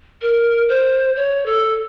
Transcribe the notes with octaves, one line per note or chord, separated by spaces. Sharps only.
A#4
C5
C#5
A4